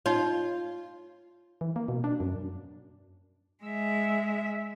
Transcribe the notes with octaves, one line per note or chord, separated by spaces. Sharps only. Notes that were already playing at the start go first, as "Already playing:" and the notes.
D#4 F4 C#5
E3
A#3
B2
D4
F#2
G#3 E5